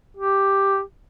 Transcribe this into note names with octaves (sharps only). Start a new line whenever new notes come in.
G4